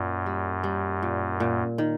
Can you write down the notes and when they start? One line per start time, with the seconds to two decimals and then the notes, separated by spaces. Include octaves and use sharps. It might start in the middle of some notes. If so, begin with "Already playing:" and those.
Already playing: F#2 A#2
0.26 G3
0.64 G3
1.03 A#2
1.40 A#2
1.78 D#3